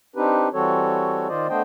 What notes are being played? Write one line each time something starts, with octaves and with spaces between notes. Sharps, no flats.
C4 D4 D#4 G4 B4
E3 G3 C4 F#4 A4 C#5
D#3 F4 C5 D5 D#5
A3 B3 D4 C5 D#5 G5